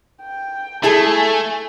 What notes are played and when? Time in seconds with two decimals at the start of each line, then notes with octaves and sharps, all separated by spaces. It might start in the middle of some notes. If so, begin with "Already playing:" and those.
0.22 G5
0.83 A3 E4 G#4 A4 G#5